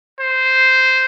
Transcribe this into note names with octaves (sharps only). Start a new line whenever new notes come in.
C5